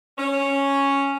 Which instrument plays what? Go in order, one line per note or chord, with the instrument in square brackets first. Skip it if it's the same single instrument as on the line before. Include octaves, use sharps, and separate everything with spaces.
[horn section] C#4